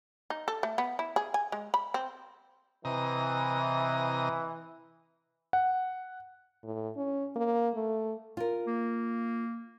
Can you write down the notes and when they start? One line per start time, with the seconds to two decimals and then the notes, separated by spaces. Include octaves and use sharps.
0.30 D#4
0.48 A4
0.63 A3
0.78 B3
0.99 E4
1.16 G#4
1.34 G#5
1.52 G#3
1.74 B5
1.94 C4
2.85 C3 E3 D#5 A#5
5.53 F#5
6.63 A2
6.97 C#4
7.36 A#3
7.75 A3
8.37 F4 A#4
8.67 A#3